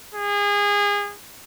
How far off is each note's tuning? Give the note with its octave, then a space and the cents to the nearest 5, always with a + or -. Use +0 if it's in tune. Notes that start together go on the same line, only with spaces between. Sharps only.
G#4 -30